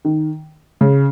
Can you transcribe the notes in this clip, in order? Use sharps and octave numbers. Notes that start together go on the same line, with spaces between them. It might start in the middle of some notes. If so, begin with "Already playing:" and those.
D#3
C#3